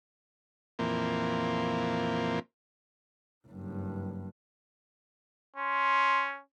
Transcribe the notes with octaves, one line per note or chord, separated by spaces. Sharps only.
F2 A#2 E3 A#3 C4
F#1 G2
C#4 C6